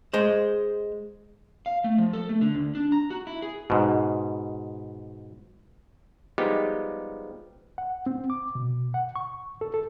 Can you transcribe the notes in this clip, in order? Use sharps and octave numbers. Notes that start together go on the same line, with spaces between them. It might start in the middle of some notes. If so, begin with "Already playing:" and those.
G#3 C5
F5
A3
F3
A4
A3
D3
D2
D4
A#5
F#4
E4
G#4
G#2 B2
F3 G3 G#3 B3 D#4 G4
F#5
C4
D6
B2
F#5
C#6
A4
A4